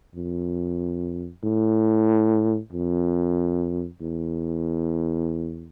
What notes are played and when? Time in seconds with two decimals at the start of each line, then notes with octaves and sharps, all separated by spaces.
0.15 F2
1.44 A2
2.73 F2
4.02 E2